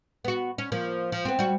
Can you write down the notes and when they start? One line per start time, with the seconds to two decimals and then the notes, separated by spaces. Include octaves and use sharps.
0.25 B3 F#4
0.58 C#4
0.72 F3 A#3
1.12 F3
1.25 B3 C4
1.39 G3 F#4